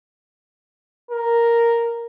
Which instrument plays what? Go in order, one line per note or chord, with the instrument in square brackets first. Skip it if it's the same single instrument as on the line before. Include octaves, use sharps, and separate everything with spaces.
[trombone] A#4